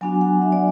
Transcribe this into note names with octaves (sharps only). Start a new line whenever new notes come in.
F#3 B3 D4 F#4 G#5
F#5
E5
D5